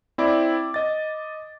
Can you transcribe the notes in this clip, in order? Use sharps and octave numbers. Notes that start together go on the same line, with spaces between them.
C4 E4 D5 D6
D#5 A6